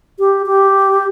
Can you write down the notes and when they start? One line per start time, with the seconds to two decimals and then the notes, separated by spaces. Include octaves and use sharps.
0.19 G4
0.47 G4